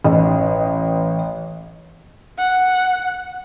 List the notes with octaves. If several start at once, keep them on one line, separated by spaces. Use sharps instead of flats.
A1 D#5
F#5